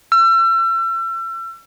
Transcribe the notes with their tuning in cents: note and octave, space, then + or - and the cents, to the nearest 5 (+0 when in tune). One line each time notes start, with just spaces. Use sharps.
E6 +40